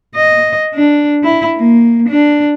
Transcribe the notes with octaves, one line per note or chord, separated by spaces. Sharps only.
D#5
D4
E4
A#3
D4